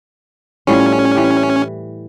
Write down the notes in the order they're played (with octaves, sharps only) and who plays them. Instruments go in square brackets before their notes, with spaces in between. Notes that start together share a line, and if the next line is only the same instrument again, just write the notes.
[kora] A2 F3 G3 [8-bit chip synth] C#4
[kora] E3 G4